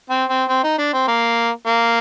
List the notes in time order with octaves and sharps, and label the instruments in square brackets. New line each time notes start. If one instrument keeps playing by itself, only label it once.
[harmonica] C4
C4
C4
D#4
D4
C4
A#3
A#3